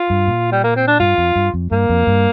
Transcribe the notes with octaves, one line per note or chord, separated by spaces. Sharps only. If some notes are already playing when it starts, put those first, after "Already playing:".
Already playing: F4
G2
A#2
G3
A#3
C4
D4
G2 F4
F2
G2
F2
G2 A#3
F2
G2